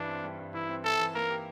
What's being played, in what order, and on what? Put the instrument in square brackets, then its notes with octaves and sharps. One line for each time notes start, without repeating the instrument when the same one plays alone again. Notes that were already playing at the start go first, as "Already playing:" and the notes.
Already playing: [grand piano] G2 E3 G3 [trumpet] D4
[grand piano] C4
G3
G2
[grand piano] E3 [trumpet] E4
[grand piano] C4
[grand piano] E4 [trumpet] A4
[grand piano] E3
[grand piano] A#3 [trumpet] A#4
[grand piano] G4